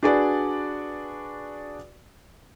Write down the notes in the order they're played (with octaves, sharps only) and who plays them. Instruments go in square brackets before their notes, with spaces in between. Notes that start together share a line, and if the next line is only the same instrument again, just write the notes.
[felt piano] D4 F#4 G#4 B4 D5